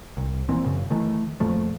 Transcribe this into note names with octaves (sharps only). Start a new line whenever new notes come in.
C2
A#2 E3 C4
F#2 C#3
D#3 E3 A3
F2 A#2 F3 A3